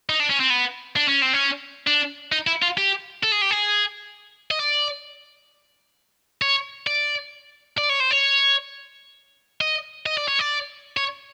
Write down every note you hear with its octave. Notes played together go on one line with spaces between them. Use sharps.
D#4
D4
C#4
C4
B3
D4
C#4
C4
C#4
D4
D#4
E4
F4
G4
A4
G#4
G4
G#4
D#5
D5
C#5
D5
D5
C#5
C5
C#5
D#5
D#5
D5
C#5
D5
C#5